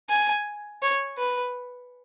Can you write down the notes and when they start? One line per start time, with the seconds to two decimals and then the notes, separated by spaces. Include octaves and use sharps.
0.10 G#5
0.82 C#5
1.18 B4